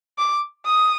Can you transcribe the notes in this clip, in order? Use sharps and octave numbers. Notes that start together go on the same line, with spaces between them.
D6
D#6